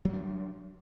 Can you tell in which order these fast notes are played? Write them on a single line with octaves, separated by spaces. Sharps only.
F#3 G3 D4